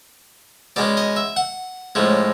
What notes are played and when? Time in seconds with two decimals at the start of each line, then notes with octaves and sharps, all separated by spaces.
0.76 B2 G#3 C#4 D5
0.97 D#5
1.16 E5
1.36 F#5
1.95 A2 F3 G#3 C#4